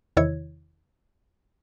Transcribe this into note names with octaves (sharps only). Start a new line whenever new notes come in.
E2 C3 D#3 E4 C#5 G#6